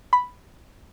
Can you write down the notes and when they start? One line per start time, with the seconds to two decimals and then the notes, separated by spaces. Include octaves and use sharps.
0.13 B5